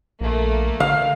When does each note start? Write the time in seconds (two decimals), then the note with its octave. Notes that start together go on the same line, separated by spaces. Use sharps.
0.21 A#1 A3 A#3
0.80 D3 F5